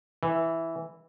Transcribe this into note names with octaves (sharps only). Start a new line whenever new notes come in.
E3